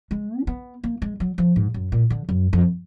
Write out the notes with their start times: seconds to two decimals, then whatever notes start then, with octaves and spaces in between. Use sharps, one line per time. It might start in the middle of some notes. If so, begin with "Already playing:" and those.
0.11 G#3
0.40 D4
0.47 B3
0.84 A#3
1.02 G#3
1.20 F#3
1.38 F3
1.56 G#2
1.74 F#2
1.92 A#2
2.10 D3
2.29 F#2
2.53 F2